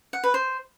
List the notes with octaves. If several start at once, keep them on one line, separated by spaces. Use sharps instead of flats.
F#5
B4
C5